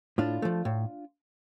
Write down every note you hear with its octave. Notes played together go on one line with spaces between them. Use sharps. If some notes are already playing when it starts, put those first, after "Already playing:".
A2 D4 F4
F3 A3
A2